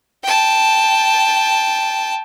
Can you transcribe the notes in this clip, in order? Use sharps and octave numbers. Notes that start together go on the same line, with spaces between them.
G5 A5